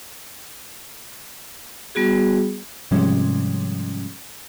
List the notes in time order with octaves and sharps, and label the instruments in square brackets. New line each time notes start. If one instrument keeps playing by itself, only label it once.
[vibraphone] G3 B3 F#4 G#4
[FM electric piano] G#2 C3 F3 G3 G#3 C#4